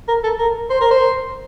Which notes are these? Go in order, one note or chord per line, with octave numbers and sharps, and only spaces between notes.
A#4
A4
A#4
C5
A#4
C5